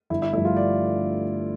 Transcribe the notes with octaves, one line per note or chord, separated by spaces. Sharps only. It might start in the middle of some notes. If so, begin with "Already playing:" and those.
G1 E4
E4
G2 F3 A3 E4
F4
D5